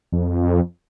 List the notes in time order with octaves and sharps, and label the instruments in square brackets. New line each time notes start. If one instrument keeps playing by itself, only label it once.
[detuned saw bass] F2